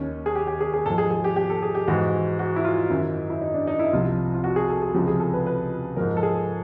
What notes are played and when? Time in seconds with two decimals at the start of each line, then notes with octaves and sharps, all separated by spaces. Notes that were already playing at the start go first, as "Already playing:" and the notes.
Already playing: D#2 D#3 C#4
0.26 G#4
0.35 G4
0.47 G4
0.61 G#4
0.74 G#4
0.86 G#2 A4
0.90 F3
0.98 G#4
1.11 G#4
1.24 G4
1.36 G4
1.50 A4
1.63 G#4
1.75 G4
1.88 G#2 E3 F#4
2.39 F#4
2.56 E4
2.64 F4
2.90 F#2 D#3 E4
3.30 E4
3.41 D#4
3.54 D4
3.67 D#4
3.79 E4
3.93 C2 C3 F3 F4
4.34 F4
4.44 F#4
4.56 G#4
4.69 A4
4.82 G#4
4.94 C#2 C3 F3 G4
5.08 G#4
5.20 A4
5.34 B4
5.46 B4
5.96 G#2 F3 A#4
6.17 A4
6.23 G#4